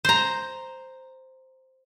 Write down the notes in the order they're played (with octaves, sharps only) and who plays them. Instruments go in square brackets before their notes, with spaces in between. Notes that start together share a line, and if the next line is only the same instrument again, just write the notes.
[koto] C5 A#5